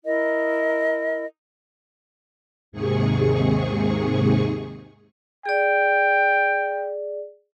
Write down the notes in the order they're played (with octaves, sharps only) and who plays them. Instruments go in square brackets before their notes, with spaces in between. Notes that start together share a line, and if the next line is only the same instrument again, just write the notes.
[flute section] E4 A#4 D#5
[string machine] D#2 G#2 C3 G#4 C#6
[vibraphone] G#4 D5 [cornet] G5